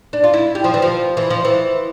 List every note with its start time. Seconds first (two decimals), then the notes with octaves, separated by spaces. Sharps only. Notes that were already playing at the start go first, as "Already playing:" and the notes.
0.13 D4
0.24 F4
0.34 E4
0.55 G3
0.64 F3
0.74 E3
0.82 F3
1.17 E3
1.30 F3
1.45 E3